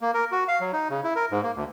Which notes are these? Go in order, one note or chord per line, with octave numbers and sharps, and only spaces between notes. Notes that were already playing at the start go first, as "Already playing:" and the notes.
A#3
A#4
F#4
F5
F#3
D#4
C#3
E4
A#4
G#2
A#3
D2